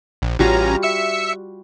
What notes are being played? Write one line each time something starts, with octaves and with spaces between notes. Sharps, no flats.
A#1
A1 G3 C#4 F4 F#4 A#5
E5 E6 C#7